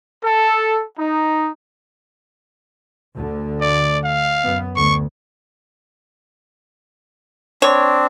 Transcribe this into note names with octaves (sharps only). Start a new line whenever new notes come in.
A4
D#4
D2 D3
D5
F5
F#2 B3
D2 C#6
C4 D4 C#5